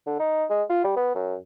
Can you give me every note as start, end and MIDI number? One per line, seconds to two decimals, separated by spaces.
0.06 0.17 50
0.19 0.44 63
0.50 0.63 56
0.69 0.79 65
0.84 0.93 55
0.96 1.12 59
1.15 1.36 42